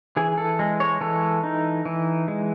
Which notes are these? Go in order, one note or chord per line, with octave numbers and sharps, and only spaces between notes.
E3 G#4
A4
G#3
C#5
E3 A4
D#4
E3
G#3